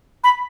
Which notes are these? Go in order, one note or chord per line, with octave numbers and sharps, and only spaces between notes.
B5